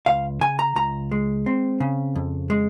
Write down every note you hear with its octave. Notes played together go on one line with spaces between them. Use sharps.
C#2 F5
C#3 G#5
A#5
C#2 A#5
G#3
C4
C#3
F2
G#3